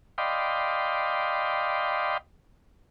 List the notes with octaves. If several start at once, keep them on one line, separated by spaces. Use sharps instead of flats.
D5 D#5 F5 G5 B5 C6